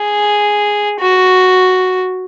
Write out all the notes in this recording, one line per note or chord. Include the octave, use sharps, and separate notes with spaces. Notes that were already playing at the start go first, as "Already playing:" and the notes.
Already playing: G#4
F#4